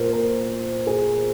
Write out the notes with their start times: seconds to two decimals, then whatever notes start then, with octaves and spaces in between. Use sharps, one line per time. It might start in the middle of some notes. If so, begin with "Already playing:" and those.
Already playing: A#2 A#4 C5
0.13 A#4
0.87 G#4